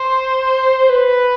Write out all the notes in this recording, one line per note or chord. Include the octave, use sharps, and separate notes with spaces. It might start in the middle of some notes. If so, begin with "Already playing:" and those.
Already playing: C5
B4